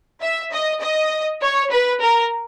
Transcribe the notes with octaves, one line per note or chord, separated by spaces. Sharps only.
E5
D#5
D#5
C#5
B4
A#4